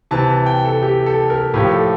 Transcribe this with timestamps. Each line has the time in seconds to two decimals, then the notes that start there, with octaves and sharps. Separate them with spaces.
0.11 C3 E3 A5
0.29 A5
0.46 G5
0.65 A4
0.83 G4
1.06 A4
1.30 A#4
1.54 A2 F3 G4
1.71 A4